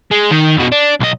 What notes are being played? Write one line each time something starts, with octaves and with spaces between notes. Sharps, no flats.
G#3
D#3
F2 B2
D4
B1 D#5